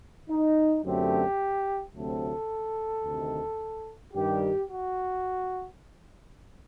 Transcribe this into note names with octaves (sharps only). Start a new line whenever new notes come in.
D#4
F#2 D3 F#3 A3 C4 G4
D2 C3 F#3 A3 C4 A4
D2 C3 D#3
G2 D#3 G3 G4
F#4